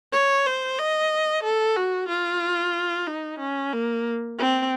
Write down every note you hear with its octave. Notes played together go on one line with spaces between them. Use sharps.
C#5
C5
D#5
A4
F#4
F4
D#4
C#4
A#3
C4